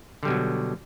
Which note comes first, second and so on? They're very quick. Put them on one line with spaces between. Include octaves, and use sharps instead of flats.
D3 G3 B2 F#3